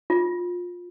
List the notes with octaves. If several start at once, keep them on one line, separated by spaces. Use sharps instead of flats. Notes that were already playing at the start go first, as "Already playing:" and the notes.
F4